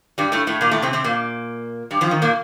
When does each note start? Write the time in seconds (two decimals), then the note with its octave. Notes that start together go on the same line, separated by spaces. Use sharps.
0.18 G2 G3
0.32 A2 A3
0.47 A2 A3
0.61 A#2 A#3
0.71 A2 A3
0.82 C3 C4
0.93 C3 C4
1.04 A#2 A#3
1.91 G2 G3
2.01 F2 F3
2.11 D#3
2.22 A#2 A#3